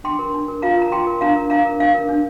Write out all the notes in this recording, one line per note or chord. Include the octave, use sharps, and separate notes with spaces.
D4 G5 C6
A#4
D4
A#4
F4 F5 A#5
A#4 A#5
F4 G5 C6
A#4
D4 F5 A#5
A#4
D4 F5 A#5
A#4
D4 F5
A#4
D4